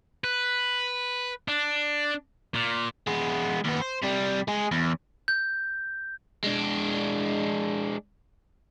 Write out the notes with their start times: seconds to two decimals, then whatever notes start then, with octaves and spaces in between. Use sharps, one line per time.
0.24 B4
1.48 D4
2.54 A#2
3.07 G#3 B3
3.65 D#2 B3
3.82 C5
4.03 C3 G3
4.48 G#3 G#4
4.72 E2
5.28 G6
6.44 G#3 D4